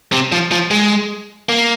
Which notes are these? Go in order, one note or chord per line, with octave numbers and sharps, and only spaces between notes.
C3
F3
F3
G#3
A#3